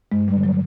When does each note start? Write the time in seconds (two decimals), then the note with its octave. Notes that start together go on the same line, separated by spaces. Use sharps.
0.12 G2 G#3
0.28 G3
0.36 D3
0.43 F#3